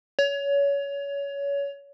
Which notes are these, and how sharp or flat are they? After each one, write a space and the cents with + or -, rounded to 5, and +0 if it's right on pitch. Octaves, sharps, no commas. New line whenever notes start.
C#5 +25